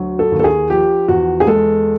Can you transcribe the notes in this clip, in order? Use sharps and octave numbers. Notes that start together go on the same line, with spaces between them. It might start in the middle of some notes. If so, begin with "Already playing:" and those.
Already playing: D2 F#3
A4
D#2
A4
G#4
F3 G4
E2 F#4
G#4
G#3 A4